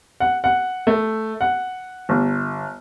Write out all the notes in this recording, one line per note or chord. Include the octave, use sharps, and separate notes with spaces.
F#5
F#5
A3
F#5
G1